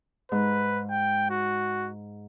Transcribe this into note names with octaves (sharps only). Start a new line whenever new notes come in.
G#2 B4
G5
F#4